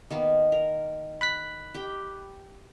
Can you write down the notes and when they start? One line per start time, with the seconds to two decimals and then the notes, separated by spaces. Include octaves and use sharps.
0.10 D#3 A#3 B3
0.52 A#4
1.21 B5 F#6 B6
1.74 G4 G5